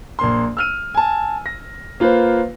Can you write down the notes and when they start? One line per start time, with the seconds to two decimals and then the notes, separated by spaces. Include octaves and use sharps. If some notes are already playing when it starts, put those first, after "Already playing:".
0.19 A#1 A#3 C6
0.57 E6 F6 D#7
0.95 G#5 A5
1.46 A#6
2.00 A#3 F4 B4 C5